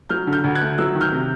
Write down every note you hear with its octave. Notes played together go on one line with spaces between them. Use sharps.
F#3 F6 G6
D3
F6 G6
D2
F#6 G#6
A3
F#3 E6 F#6
D#3
F6 G6
C3